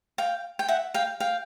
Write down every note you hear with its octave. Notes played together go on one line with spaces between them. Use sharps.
F5 G5
G5
E5 F#5
F5 G5
F5 G5